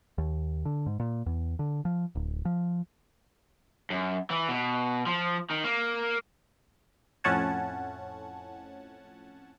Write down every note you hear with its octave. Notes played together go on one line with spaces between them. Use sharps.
D#2
D3
G#2
A#2
E2
D3
F3
D1
F3
F#2
E3
B2
F3
D#3
A#3
F2 A2 C#4 F#5 A5 G#6